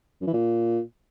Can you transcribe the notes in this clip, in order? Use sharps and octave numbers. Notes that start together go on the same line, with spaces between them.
F#2
E3
A#2